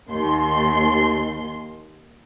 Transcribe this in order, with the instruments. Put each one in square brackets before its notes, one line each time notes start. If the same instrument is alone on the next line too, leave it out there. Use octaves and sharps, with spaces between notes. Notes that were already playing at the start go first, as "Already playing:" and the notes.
[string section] D#2 C6